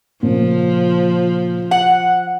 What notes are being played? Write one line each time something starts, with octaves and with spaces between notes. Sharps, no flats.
A#2 C#3 F3
F#5